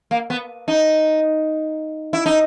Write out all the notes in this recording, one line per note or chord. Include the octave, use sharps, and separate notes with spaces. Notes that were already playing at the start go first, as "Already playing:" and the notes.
A#3
B3
D#4
E4
D#4